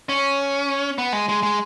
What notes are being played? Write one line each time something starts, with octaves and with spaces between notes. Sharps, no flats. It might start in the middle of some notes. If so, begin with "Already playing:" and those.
C#4
B3
G#3
G#3
G#3